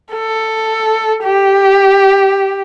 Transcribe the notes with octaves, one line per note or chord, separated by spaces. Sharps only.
A4
G4